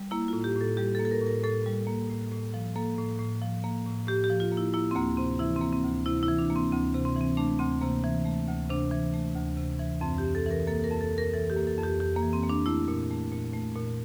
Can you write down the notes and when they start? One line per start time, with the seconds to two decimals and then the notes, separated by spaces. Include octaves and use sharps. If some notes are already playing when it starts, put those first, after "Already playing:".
Already playing: G3
0.11 A#3 E4
0.28 F4
0.33 A2
0.44 G4
0.56 A2 A4
0.77 G3 G4
0.95 A4
0.99 A#3
1.05 A4
1.11 A#4
1.21 A2
1.27 A#4
1.44 A2 A4
1.66 G3
1.87 A#3
2.10 A2
2.32 A2
2.54 F3
2.76 A#3 A4
2.98 A2
3.19 A2
3.42 F3
3.64 A#3
3.86 A2
4.07 A2 G4
4.24 G4
4.30 F3
4.40 F4
4.52 A#3
4.57 E4
4.74 A#3 E4
4.91 C4
4.95 D2 A#3
5.17 C3 C4
5.39 E3 E4
5.56 C4
5.61 A#3
5.73 C4
5.83 D2
6.06 C3 E4
6.23 E4
6.28 E3
6.39 D4
6.50 A#3
6.56 C4
6.72 D2 C4
6.94 C3
7.05 C4
7.16 E3
7.21 C4
7.37 A3 D4
7.59 D2 C4
7.82 C3 A#3
8.04 E3
8.26 A3
8.48 D2
8.69 C3 D4
8.91 E3
9.14 A3
9.35 D2
9.57 C3
9.79 E3
10.01 F2 C4
10.18 G4
10.24 F2
10.35 A4
10.46 E3 A#4
10.67 A#3 A4
10.84 A#4
10.90 F2
11.01 A4
11.11 F2
11.18 A#4
11.34 E3 A4
11.50 G4
11.56 A#3
11.67 A4
11.78 F2 G4
11.99 F2 G4
12.16 A#3
12.22 E3
12.33 C4
12.43 A#3
12.49 D4
12.66 A3 E4
12.88 A#2
13.10 A3
13.32 A#2
13.54 A3
13.76 A#2